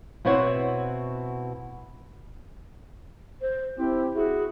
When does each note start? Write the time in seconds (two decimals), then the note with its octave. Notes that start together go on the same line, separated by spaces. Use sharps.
0.25 B2 C4 E4 C5 C#5 F#5
3.41 C5
3.78 C4 E4 G4
4.15 E4 F#4 G#4